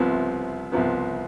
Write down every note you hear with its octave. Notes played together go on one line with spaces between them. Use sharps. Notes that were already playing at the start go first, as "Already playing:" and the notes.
Already playing: C2 C3 F3 B3
C2 C3 F3 B3